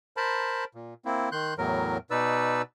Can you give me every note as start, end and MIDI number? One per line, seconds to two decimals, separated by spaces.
0.17 0.64 70
0.17 0.64 72
0.17 0.64 81
0.17 0.64 83
0.75 0.94 46
1.05 1.29 58
1.05 1.29 60
1.05 1.29 64
1.32 1.54 51
1.32 1.54 84
1.32 1.54 90
1.32 1.54 91
1.58 1.97 40
1.58 1.97 45
1.58 1.97 54
1.58 1.97 70
2.11 2.62 47
2.11 2.62 63
2.11 2.62 71
2.11 2.62 74
2.11 2.62 88